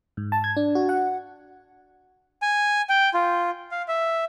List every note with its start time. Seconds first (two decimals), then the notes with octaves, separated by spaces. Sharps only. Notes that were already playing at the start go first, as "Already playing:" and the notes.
0.17 G#2
0.32 A5
0.44 G#6
0.57 D4
0.75 F#4
0.89 F#5
2.42 G#5
2.89 G5
3.14 F4
3.71 F5
3.88 E5